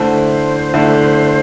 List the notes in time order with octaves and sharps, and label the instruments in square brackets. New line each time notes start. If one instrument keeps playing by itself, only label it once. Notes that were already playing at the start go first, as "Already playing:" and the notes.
Already playing: [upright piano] D3 A3 E4 [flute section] C5
[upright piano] D3 A3 E4